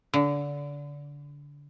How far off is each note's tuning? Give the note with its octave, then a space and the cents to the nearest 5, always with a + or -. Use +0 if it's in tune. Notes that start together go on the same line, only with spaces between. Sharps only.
D3 -25